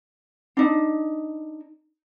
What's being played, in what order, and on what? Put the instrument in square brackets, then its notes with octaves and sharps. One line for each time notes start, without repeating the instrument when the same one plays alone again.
[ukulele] D4 D#4